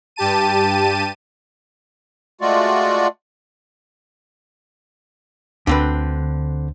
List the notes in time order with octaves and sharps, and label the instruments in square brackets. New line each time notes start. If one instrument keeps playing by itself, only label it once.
[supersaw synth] G2 G4 A5 D#7
[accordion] G#3 A3 F4 F#4 D5
[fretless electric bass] D2 [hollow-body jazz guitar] D3 C4 B4